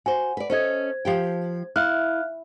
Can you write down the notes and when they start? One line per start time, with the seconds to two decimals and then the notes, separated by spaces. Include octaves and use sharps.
0.06 F#4 C5 G#5
0.37 B4 D5
0.50 C#4 A4 C5 D#5 G#6
1.05 F3 G4 G5
1.76 E4 F5 F6 F#6